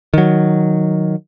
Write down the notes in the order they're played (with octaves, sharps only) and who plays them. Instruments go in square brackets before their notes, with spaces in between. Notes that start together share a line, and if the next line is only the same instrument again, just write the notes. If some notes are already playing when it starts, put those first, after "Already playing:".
[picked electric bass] D#3 F#3